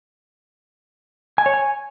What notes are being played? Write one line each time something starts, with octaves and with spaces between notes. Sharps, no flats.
G#5
C#5
G#5